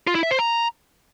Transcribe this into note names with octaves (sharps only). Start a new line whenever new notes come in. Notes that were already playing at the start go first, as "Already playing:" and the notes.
F4
E4
E5
C5
A#5